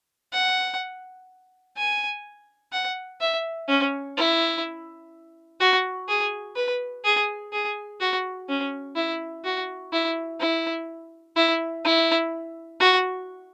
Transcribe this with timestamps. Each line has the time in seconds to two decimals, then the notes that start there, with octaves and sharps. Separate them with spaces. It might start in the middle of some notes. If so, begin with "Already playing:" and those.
0.33 F#5
1.77 G#5
2.72 F#5
3.21 E5
3.68 C#4
4.17 E4
5.60 F#4
6.08 G#4
6.56 B4
7.04 G#4
7.53 G#4
8.00 F#4
8.48 C#4
8.96 E4
9.44 F#4
9.93 E4
10.40 E4
11.36 E4
11.85 E4
12.80 F#4